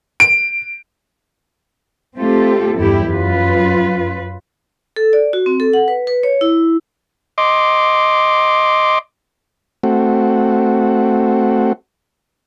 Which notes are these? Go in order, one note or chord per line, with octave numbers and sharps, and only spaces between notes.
D7
A3 C4 F4 G4 A4
E2 G2 E4 G4
F#2 F4 B4
A4
D5
F#4
C4
A4
F#5
B4
B4
C#5
E4
D#5 C6 D6
A3 C4 F#4